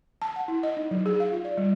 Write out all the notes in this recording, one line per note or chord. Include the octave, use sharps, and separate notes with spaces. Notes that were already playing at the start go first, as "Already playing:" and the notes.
A5
F#5
E4
D#5
D#4
F#3
G#4
F5
F4
D5
G3